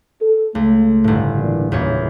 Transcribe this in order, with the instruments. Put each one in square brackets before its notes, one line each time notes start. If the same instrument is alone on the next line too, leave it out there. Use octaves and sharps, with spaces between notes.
[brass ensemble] A4
[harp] C#2 [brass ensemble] A3
[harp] G1 A2
[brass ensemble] A#2 E3 D4
[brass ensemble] F#1 [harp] E2 A#2 C#5